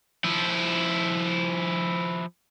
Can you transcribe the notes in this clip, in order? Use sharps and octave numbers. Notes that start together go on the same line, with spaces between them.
F3 E4